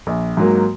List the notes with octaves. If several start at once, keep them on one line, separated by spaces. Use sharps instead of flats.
A#1
G#2 F#3 A#3